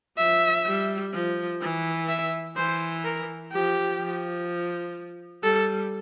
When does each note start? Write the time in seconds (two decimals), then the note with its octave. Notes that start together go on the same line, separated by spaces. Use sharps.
0.18 F3 E5
0.66 G3
1.13 F3
1.61 E3
2.09 E5
2.57 E3 C5
3.04 A#4
3.52 F3 G4
4.00 F3
5.43 G3 A4